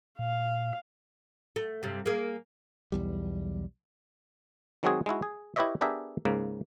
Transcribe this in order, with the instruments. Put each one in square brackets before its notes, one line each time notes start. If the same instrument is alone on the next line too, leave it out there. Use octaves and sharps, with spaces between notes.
[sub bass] A#2 [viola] F5
[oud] A3
G2 C3
A#3 G#4
[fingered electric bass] B1 E2 G3
[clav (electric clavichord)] D#3 F#3 G#3 C4 F#4 G#4
G#3 D#4 E4 F#4
G#4
E4 G4 B4 C#5 D#5 E5
B3 D4 G4 G#4 A#4 E5
C#2 G#2 C#3 A#3